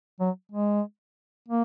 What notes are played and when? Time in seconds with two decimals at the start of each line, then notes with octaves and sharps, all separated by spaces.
0.20 F#3
0.52 G#3
1.48 A#3